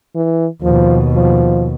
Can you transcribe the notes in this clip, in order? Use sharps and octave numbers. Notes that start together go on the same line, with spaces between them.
E3
D#2 B2 F3
F3